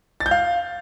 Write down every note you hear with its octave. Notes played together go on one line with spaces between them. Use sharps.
A6
G6
F5